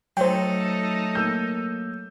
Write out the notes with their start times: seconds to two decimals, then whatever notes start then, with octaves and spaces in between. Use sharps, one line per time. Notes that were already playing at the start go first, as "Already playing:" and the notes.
0.17 F#3 A3 D#4 A4 C5 G5
1.15 A#3 E6 G6